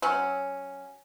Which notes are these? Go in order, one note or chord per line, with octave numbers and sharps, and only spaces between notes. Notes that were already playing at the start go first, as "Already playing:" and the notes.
F#3 C#4